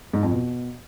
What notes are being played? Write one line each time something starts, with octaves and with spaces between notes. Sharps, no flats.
G#2
F2
B2